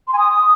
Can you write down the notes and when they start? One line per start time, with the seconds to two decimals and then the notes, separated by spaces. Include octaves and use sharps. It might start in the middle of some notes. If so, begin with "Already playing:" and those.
0.07 C6
0.13 G#5
0.18 D#6